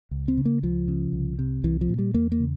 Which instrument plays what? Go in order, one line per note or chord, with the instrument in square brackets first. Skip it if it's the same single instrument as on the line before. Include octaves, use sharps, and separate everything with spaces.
[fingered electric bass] C#2
C4
C#3
A#3
C#2 F3
C#3
C2
C3
C2 E3
F3
A#2
G3
E2 A#3
A#3
C#3